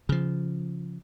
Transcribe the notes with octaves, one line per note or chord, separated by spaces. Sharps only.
C#3 F3